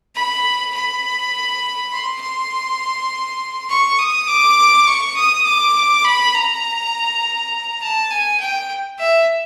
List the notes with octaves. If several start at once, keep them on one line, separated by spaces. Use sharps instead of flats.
B5
B5
C6
C6
C#6
D#6
D6
C#6
D#6
D6
B5
A#5
A5
G#5
G5
E5